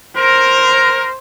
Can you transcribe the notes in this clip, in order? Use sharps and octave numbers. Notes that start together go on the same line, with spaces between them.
A#4 C5